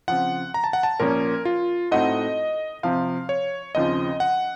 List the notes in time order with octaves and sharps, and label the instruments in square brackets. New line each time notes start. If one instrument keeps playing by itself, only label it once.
[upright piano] C#3 F3 C4 F4 [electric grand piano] F#5
[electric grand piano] A#5
A5
F#5
A5
[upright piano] A#2 F3 A#3 C#4 [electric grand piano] A#4
[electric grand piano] F4
[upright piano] A2 A3 C4 D#4 F#4 [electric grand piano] D#5
[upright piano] C3 F3 C4 [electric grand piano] F5
[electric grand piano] C#5
[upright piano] D#2 C#3 F3 C4 F4 [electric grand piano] D#5
[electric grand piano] F#5